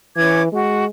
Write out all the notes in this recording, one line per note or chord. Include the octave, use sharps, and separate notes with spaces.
E3 C#4 D6 G#6
G#3 F#4